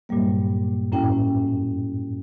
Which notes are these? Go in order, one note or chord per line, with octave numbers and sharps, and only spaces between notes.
G2 A#2 F#3 G3 A#3
F#2 A2 C#4 E4 G5